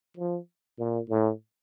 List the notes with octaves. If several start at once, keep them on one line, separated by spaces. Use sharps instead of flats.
F3
A#2
A2